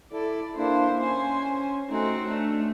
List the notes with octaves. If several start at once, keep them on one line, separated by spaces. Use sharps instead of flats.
E4 A4 D5
A#3 D4 E4 C5
C#4 C5 G#5
A3 C4 C#4 D#4 F#4
A3 D4